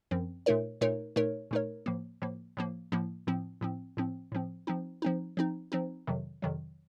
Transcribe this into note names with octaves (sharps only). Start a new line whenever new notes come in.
F#2 F3 C4
A#2 A3 D#4 A#4 C#5
A#2 A3 D#4 A#4 C#5
A#2 A3 D#4 A#4 C#5
A#2 A3 D#4 A#4 C#5
A2 F3 A#3
A2 F3 A#3
A2 F3 A#3
A2 F3 A#3
A2 F3 C4
A2 F3 C4
A2 F3 C4
A2 F3 C4
F3 C4 D#4
F3 C4 D#4
F3 C4 D#4
F3 C4 D#4
F2 C3 D#3 F#3
F2 C3 D#3 F#3